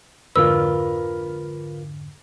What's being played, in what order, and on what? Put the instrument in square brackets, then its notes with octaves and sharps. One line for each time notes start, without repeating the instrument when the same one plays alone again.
[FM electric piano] F2 G#2 D3 [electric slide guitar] F4 A#4 B4 [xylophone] E6